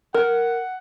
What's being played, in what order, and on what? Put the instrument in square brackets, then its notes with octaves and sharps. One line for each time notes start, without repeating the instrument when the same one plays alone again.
[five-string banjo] A#4 [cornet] F#5